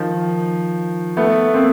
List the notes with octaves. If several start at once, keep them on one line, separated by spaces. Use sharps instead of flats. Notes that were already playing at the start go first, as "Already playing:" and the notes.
Already playing: D#3 F3
A3 B3
A#3 C4